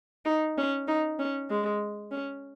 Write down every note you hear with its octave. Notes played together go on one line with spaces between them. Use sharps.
D#4
C#4
D#4
C#4
G#3
C#4